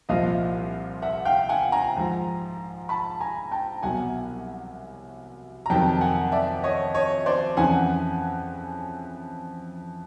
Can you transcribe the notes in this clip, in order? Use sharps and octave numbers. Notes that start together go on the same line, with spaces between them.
C2 A#2 F3 D#5 F5
E5 F#5
F5 G5
F#5 G#5
G#5 A#5
G#2 F3
A5 B5
G#5 A#5
G5 A5
C2 B2 F#3 F#5 G#5
A#5
F2 C3 D#3 F#3 G5 A5
F#5 G#5
D5 E5
C#5 D#5
C#5 D#5
C5 D5
F2 C#3 E3 F#5 G#5